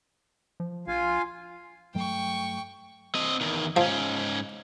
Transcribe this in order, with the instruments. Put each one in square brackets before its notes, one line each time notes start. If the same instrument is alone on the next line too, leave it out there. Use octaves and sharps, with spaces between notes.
[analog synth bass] F3
[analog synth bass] A#1 [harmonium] F4 F5 G#5
[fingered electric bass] G2 F#3 A3 [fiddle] G5 C#6
[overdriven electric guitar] C4 D#5
E2 D#3
[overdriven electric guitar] G#2 C#4 [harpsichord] F3